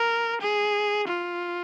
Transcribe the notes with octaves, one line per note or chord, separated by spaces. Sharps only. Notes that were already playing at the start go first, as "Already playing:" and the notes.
Already playing: A#4
G#4
F4